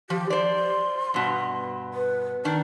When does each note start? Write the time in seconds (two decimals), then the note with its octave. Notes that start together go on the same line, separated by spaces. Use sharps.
0.10 F3 G4
0.30 C5 D5 C6
1.14 G2 B2
1.94 B4
2.45 D#3 D4 A5